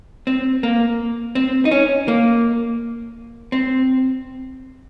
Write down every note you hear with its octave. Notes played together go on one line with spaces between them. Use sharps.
C4
A#3
C4
D#4
C#4
A#3
C4